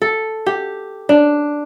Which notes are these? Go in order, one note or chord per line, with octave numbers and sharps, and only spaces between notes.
A4
G4
D4